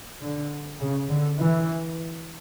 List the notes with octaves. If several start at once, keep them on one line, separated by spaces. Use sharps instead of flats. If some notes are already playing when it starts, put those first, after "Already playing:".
D3
C#3
D3
E3